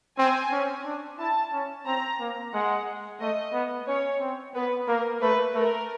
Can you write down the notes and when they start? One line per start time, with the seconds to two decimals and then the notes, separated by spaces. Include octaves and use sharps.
0.18 C4 G#5
0.52 C#4
0.85 D4
1.19 E4 A5
1.53 C#4
1.86 C4 A#5
2.20 A#3
2.53 G#3 F#5
3.20 A3 D#5
3.53 B3
3.87 C#4 C#5
4.21 C4
4.54 B3 B4
4.88 A#3 A#4
5.21 A3 B4
5.55 A3 A#4